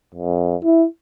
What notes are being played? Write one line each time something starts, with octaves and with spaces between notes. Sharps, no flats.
F2
E4